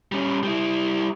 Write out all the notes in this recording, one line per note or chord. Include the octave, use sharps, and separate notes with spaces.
G3 C#4
G3 E4